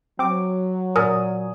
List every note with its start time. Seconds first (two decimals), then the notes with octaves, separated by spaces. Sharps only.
0.19 F#3 C4 D6
0.96 A#2 A#4 G#5 D#6